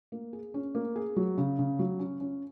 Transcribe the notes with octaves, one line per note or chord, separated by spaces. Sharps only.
A#3
G#4
C#4
A#3
G#4
F#3
C#3
C#3
F#3
C#4
C#4